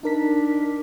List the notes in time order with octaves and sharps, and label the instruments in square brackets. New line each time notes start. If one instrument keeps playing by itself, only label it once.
[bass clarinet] D4 [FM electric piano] D#4 A#4 B6